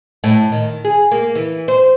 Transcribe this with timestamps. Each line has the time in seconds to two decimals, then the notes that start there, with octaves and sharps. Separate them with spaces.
0.24 A2
0.52 D#3
0.85 G#4
1.12 A#3
1.35 E3
1.68 C5